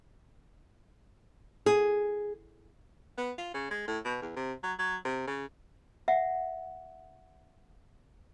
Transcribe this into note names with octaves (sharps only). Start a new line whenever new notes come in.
G#4
B3
F4
C#3
G#3
A2
B2
E2
C3
F#3
F#3
C3
C#3
E5 F#5